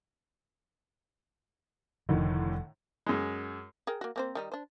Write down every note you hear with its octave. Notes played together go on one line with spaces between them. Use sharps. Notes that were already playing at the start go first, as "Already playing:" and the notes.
F1 A2 D3 D#3 F3
F#2 G#3
G#4 A#4 G5
A#3 F#4
A#3 C4 C5
D#3 G3 D#4
D4 C5